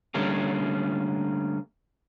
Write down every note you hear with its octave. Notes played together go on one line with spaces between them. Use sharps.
D3 G3 A3 A#3 C#4